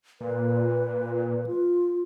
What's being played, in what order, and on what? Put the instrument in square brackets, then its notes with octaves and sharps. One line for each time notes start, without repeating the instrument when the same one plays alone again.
[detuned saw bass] A#2 [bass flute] B4
[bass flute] F4